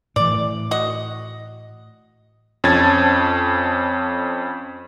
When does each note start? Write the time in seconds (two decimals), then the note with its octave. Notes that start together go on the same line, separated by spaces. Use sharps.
0.16 A2 E3 D5
0.71 F#4 D#5
2.64 F2 C#4 A5 G#6 A6